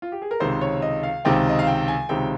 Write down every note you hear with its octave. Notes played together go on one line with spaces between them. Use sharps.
F4
G4
G#4
A#4
C#2 C3 D#3 C5
C#5
D#5
F5
C#2 C3 D#3 G5
D#5
F5
G5
G#5
C#2 C3 D#3 G5